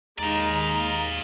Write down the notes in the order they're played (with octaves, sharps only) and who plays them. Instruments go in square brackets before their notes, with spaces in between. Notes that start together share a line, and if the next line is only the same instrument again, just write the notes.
[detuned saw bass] D#2 [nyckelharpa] G#3 D#4 [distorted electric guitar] D5 F5 [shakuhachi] A#5